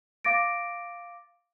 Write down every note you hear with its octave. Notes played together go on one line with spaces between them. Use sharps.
F5 D6 A6 A#6 D7